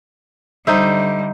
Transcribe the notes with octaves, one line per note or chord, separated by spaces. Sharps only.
D3 G3 D#4 C5 E5